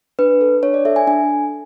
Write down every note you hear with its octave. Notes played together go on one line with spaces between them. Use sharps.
D4 B4
A4
D4 C#5
D5
A4 E5
G#5
D4 G#5
A4